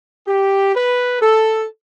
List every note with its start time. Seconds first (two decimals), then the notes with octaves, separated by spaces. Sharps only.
0.27 G4
0.75 B4
1.22 A4